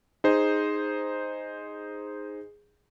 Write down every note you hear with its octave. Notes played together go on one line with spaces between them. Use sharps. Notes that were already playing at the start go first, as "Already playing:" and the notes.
D#4 G#4 C5